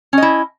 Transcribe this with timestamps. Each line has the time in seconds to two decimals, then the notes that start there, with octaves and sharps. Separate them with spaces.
0.13 C#4
0.18 D#5
0.22 E4